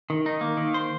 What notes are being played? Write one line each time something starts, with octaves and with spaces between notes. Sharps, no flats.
D#3
D#4
A#3
D#3
C5